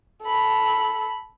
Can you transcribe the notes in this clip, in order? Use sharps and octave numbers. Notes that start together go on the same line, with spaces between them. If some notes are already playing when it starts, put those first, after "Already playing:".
A4 B5